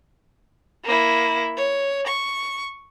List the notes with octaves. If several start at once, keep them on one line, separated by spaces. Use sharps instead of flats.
A#3 E4
C#5
C#6